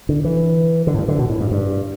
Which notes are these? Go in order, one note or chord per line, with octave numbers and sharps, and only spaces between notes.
D3
E3
D3
A2
G2
D3
B2
A2
G2
G2